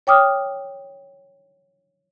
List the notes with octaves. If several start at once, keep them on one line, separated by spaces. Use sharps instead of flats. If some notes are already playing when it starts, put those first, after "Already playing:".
C#5 G5 D6 D#6 F6